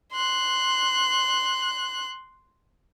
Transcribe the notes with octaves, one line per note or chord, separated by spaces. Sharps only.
C6 F#6